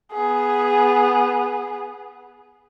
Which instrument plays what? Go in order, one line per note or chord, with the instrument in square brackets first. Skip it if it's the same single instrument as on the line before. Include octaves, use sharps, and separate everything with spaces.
[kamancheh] B3 G#4